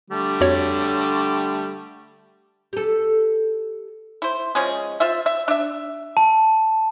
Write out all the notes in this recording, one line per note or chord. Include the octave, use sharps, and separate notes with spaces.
D3 G3 A3
F2 F#4 C#5
G4 A4
E4 C5
F3 G#3 C#4 G#4
F4 C5 E5
E5
D4 E5
A5